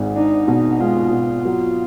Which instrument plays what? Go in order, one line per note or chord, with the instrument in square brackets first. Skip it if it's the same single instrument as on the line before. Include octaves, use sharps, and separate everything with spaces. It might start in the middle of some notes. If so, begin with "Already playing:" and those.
Already playing: [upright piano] G#1 G#2
[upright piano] D4 [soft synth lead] D#4
[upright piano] B2
[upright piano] G#3 [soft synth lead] F4
[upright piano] B2
F#3